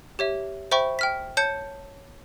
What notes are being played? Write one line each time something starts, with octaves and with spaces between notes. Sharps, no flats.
G4 C#5 E5
C5 E5 G5 B5 C#6
G5 F6 B6
C#5 A5 G6 C#7